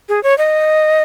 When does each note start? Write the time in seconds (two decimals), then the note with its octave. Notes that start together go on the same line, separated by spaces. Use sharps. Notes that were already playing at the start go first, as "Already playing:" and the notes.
0.09 G#4
0.23 C#5
0.38 D#5